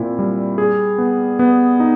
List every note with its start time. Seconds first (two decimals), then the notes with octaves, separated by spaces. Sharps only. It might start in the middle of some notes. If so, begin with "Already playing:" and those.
Already playing: A#2 C4 E4
0.19 G3
0.58 G#4
0.98 B3
1.39 B3
1.80 D#4